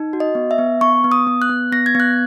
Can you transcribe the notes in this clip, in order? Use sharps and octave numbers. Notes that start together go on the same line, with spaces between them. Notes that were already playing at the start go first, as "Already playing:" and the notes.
Already playing: D#4
F#4
D#5
B3
E5
B3
B3 C#6
B3
D#6
B3
F#6
B3
B3 A#6
G#6
B3 F#6